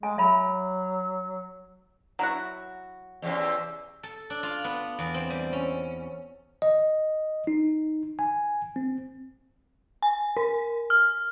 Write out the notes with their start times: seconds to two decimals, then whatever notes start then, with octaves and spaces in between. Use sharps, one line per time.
0.03 G#3 G#5
0.18 F#3 E5 B5
2.19 F#3 E4 F#4
3.22 E2 C3 C#4
4.03 A4
4.30 D4
4.43 F4
4.64 B3
4.99 E2
5.14 C4
5.30 G3
5.53 C#4
6.62 D#5
7.47 D#4
8.19 G#5
8.76 C4
10.02 G#5
10.37 A#4
10.90 F6